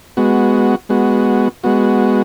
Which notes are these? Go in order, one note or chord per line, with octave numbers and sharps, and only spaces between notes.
G#3 B3 F#4
G#3 B3 F#4
G#3 B3 F#4